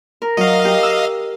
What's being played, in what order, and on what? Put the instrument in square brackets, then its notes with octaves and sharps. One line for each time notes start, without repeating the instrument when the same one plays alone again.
[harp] A#4
[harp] F#3 [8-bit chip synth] D#5 F5
[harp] G4
E6